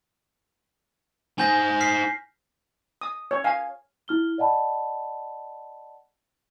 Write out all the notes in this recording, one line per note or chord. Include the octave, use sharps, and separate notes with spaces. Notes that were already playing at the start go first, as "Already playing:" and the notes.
D#4 C5 G#5 G6 A#6
F6 B6 C7
D#6
C#5
F5 G#5
E4 F6 G7
D5 D#5 F#5 A5 B5